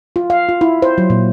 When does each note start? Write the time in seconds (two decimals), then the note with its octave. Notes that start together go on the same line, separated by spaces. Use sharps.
0.16 F4
0.30 F5
0.49 F4
0.61 E4
0.82 C5
0.98 F#3
1.10 A#2